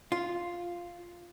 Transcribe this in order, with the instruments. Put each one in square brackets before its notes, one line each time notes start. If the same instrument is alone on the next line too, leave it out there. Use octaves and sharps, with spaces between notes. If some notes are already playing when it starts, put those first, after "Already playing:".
[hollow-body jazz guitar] F4